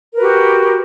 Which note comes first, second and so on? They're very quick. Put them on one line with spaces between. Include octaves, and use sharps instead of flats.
A#4 B4 F#4 G4